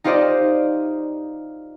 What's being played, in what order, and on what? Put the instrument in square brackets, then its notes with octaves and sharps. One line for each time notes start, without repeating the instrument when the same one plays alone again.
[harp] D#4 F4 G4 C5 D5 D#5